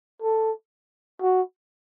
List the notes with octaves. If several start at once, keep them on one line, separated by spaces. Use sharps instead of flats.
A4
F#4